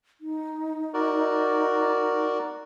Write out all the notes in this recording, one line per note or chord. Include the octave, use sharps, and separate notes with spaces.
D#4
F#4 A#4 D5